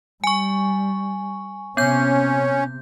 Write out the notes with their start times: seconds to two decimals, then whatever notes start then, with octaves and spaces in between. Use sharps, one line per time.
0.24 G3 G#5 C#6
1.77 C3 B3 C#4 G6